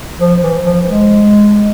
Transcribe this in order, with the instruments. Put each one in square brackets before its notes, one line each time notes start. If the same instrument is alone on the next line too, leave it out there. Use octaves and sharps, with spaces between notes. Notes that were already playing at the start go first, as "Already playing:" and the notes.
[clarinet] F3
E3
F3
G#3